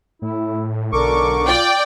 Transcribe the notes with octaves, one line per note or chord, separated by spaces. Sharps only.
A2 E4
B1 D3 A#4 C#6 D6
F4 D5 G5